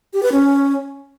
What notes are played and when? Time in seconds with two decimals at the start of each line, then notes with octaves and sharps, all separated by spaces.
0.13 G4
0.23 B4
0.32 C#4